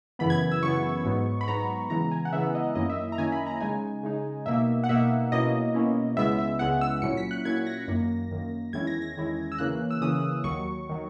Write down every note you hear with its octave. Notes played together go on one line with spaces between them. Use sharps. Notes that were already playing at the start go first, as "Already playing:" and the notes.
F#2 C#3 E3 B3 B5
G#6
E6
F#2 C#3 E3 B3 C#6
G#2 F#3 B3 D#4
B5
G#2 F#3 B3 D#4 A#5
C#3 E3 G#3 B3 A#5
G#5
F#5
C#3 E3 G#3 B3 E5
D#5
F#2 D#3 A#3 C#4 E4 D#5
E5
A#5
F#2 D#3 A#3 C#4 E4 G#5
B5
A#5
C#3 G#3 D#4 G#5
C#3 G#3 D#4
B2 A#3 D#4 E5
F#5
B2 A#3 D#4 E5
B2 A#3 C#4 E4 D#5
B2 A#3 C#4 E4
C#2 C#3 G#3 B3 E4 E5
E5
C#2 C#3 G#3 B3 E4 F#5
E6
A#2 F#3 C#4 E4 C#7
B6
F#6
A#2 F#3 C#4 E4 G#6
A#6
F#2 D#3 A#3
F#2 D#3 A#3
E2 D#3 G#3 C#4 E4 G#6
A#6
A#6
E2 D#3 G#3 C#4 E4
E6
C#3 E3 A#3 C#4 F#6
E6
C#3 E3 A#3 C#4 D#6
D#2 D#3 F#3 C#6
D#3 F#3